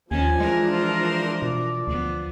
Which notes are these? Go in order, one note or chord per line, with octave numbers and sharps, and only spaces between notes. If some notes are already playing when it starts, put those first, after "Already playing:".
D#2 D#3 F3 C#4 D4 G#5
E3 G#3 A#4
F4
C5
B2 D5
D2 F3 B3